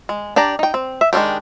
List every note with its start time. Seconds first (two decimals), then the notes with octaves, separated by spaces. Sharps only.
0.09 G#3
0.36 D4 G4 D5 A#5
0.59 D#4 G5
0.74 C4
1.01 E5
1.13 D#3 G#3 C#4 D4 G4